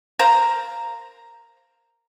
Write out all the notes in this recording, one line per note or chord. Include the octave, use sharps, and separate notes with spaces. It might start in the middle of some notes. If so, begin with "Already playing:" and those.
A#4 C5 F5 A#5